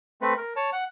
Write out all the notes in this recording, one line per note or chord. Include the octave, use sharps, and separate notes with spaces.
A3 C4 B4
A#4
C#5 A5
F#5